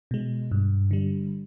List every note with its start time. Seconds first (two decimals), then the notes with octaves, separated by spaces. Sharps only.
0.11 B2 G#3
0.51 G2
0.91 D3 G3